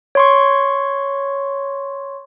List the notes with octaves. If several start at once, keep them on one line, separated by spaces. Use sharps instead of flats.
C#5 C6 C#6